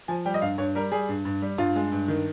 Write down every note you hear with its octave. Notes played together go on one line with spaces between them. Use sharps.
F3 G#5
G3 G5
D#5
G2 F5
G2 C#5
G3 A#4
G3 G#4
G2
G2
G3
G2 F4
G#3
G2
D#3